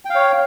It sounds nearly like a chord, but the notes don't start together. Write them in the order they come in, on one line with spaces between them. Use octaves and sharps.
G5 F5 C#5